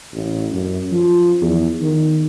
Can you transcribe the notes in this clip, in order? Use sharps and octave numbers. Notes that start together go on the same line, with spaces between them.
A1
F#2
F3
E2
D#3